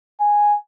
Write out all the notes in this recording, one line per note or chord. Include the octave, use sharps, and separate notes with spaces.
G#5